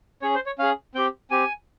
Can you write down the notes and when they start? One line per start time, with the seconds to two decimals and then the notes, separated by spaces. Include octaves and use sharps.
0.22 C#4 G#4 C#5
0.35 C5
0.46 C#5
0.59 C#4 G#4 F5
0.95 C4 G4 G5
1.31 C4 G4 G#5